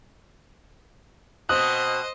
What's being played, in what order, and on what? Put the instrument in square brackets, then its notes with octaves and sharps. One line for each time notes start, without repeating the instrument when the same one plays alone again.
[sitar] B2 C4 [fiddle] C5 D#5 [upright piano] D#6 [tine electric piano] F#6